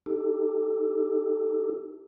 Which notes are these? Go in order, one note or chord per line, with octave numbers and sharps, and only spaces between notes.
D#4 G4 A4